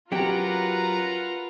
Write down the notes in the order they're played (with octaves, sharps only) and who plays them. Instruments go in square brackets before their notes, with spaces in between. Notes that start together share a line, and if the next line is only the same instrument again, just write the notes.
[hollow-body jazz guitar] F#3 C#4 G4 [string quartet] F4 A#4 B4 [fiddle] F#5 A#5